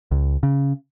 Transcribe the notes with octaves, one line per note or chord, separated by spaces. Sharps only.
C#2
C#3